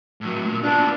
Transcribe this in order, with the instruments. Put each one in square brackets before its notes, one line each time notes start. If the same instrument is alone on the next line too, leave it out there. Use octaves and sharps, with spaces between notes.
[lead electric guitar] A2 F#3
A#2
[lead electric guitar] B3 F4 [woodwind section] D4